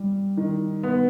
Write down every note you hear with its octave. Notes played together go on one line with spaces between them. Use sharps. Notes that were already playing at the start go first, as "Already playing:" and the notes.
Already playing: G3
D#3
B3